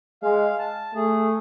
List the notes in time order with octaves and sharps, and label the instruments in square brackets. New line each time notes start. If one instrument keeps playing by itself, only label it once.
[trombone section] G#3 [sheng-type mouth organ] F5
[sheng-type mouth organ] A5
[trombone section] A3 [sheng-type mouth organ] G#4